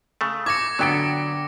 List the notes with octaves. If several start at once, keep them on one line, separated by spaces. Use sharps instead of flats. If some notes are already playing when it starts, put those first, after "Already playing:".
C#3 A3
D6 G#6 A#6 C#7 E7
D3 F#3 B3 A4 G5 D7